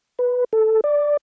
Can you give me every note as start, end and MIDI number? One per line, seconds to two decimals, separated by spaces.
0.19 0.44 71
0.53 0.81 69
0.84 1.17 74